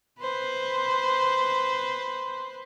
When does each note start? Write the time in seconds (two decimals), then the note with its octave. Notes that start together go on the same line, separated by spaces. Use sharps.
0.20 B4 C5